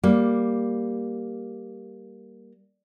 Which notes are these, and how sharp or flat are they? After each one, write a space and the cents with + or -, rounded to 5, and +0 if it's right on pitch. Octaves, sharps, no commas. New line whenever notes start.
G3 +0 A#3 +0